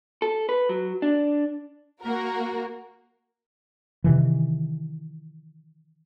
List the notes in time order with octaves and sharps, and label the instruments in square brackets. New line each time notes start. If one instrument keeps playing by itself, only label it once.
[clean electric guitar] A4
B4
F#3
D4
[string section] A#3 F#4 A#4
[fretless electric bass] C3 D#3 E3